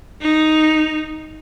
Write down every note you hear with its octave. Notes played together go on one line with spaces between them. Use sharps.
D#4